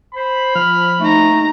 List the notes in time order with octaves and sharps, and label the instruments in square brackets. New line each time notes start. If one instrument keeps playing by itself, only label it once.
[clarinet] C5 [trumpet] B5
[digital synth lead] F3 [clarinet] F6
[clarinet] A3 [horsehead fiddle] D#4 A#5